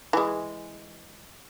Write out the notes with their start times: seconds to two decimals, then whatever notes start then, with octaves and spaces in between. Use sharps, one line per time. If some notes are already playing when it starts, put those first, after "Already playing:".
0.13 E3 G#3